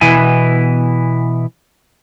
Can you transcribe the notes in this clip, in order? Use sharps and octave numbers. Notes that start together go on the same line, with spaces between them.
B2 E3 B3 E4 G#5